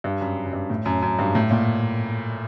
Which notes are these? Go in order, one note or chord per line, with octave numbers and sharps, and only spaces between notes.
G2
F#2
F#2
G2
A2
F#2
F#2
G2
A2
A#2